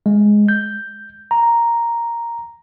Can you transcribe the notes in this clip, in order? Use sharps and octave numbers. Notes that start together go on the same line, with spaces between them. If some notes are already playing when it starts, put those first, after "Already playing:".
G#3
G6
A#5